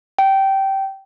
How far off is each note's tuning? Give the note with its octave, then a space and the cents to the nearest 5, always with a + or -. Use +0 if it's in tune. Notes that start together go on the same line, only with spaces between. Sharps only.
G5 -15